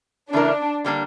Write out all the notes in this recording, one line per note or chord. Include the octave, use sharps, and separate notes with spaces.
C#3 E3 A3 D4 E4 A#4
D3 G3 A#3 D4